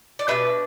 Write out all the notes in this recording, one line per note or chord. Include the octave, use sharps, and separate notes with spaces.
D5
B2 B3 D4 B4 E5